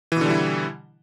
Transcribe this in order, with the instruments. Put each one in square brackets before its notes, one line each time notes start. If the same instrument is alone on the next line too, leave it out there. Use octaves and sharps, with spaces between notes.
[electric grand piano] E3
B2
D3
G3
E4